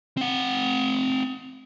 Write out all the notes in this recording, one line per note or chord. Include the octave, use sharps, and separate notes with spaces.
C4 F#5